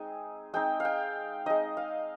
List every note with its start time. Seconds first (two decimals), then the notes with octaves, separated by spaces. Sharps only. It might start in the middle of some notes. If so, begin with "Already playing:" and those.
Already playing: G#3 C4 D#4 G#5
0.54 G#3 C4 D#4 G5
0.80 F5
0.85 G5
1.46 G#3 C4 D#4 D#5
1.77 F5